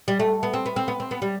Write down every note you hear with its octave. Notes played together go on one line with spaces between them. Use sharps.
G3
A3
B3
C4
B3
C4
B3
C4
B3
G3